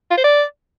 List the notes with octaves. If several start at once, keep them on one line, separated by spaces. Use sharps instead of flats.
F4
C5
D5